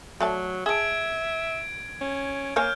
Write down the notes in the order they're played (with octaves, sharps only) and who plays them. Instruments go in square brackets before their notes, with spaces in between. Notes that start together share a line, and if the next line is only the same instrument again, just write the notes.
[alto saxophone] F#3 [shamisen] A3 D5 A5
[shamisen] G#4 A5 [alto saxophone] E5 [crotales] G#6 D7
[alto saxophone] C#4
[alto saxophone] A#3 [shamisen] A#4 C#5 G#5 [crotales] F6 G6